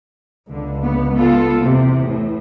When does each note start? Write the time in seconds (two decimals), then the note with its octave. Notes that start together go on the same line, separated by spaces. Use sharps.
0.50 C#2 D3
0.83 B3
1.15 B3 F4 A4
1.62 E2 C3
2.06 A2